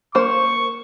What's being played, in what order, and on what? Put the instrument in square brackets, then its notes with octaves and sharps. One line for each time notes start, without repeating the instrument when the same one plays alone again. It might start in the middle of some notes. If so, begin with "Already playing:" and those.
[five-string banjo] A#3 C5 [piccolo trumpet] C#6